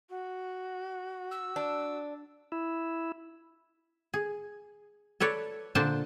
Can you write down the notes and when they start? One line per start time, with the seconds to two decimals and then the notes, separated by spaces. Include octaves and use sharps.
0.10 F#4
1.31 E6
1.56 D4
2.52 E4
4.14 G#4
5.20 A4 B4 C#5 D5
5.75 A#2 D3 D4 C5 A5